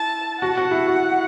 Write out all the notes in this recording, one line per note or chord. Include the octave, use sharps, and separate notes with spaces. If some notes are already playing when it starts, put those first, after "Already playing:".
Already playing: E4 A5
F#4 F#5
F#4
E4
F#4